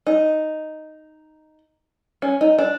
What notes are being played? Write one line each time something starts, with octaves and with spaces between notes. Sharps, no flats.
D#4
C#4
D#4
D4